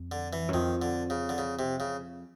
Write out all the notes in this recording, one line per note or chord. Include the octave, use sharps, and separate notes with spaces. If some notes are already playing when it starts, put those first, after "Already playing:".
Already playing: F2
D3
E3
F#2
F2 D#3
D3
C#3
D3
C#3
C3
C#3